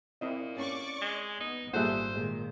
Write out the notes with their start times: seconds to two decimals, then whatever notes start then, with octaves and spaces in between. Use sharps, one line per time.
0.21 A#2 C4 E4 D#5
0.57 C#4 D5 C#6 D6
1.01 G#3
1.40 B3 D#4
1.73 G#1 A#2 G3 G#4 A4 C5 E5 F#5
2.16 A#2 D#3 G#3